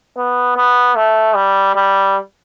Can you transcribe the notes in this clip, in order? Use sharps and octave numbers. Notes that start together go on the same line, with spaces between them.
B3
B3
A3
G3
G3